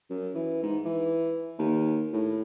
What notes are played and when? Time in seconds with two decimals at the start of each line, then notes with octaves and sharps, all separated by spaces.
0.10 F#2
0.35 E3
0.63 G#2
0.85 E3
1.59 D#2
2.13 A2